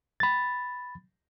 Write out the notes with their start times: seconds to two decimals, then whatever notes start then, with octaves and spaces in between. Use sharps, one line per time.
0.20 B5 A6